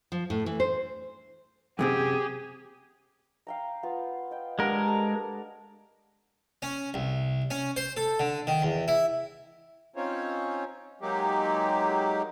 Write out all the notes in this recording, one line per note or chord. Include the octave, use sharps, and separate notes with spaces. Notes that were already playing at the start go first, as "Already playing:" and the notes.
F3
A2
E3
C5
F#2 C3 C4 G4 G#4
F5 G5 A#5
B3 F4
D#5 G5
G3 G#3 D4 A#4 F#5
A4
C#4
C2
C#4
C5
A4
D3
D#3
E2
E4
C4 C#4 D#4 F4 C5 C#5
F#3 G#3 A#3 D#4 G4